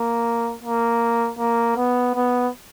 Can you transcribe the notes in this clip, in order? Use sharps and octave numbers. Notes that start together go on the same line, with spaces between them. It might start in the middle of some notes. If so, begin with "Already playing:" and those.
Already playing: A#3
A#3
A#3
B3
B3